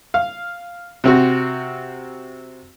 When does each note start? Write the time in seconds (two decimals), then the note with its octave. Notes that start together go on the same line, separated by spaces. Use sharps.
0.14 F5
1.04 C3 C4 F#4